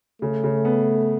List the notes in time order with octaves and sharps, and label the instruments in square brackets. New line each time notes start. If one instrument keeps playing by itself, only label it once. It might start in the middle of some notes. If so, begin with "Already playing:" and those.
[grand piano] C#3 [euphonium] A3
[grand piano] C#3
B3